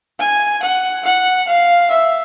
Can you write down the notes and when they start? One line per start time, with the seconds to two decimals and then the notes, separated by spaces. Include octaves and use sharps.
0.20 G#5
0.62 F#5
1.05 F#5
1.48 F5
1.91 E5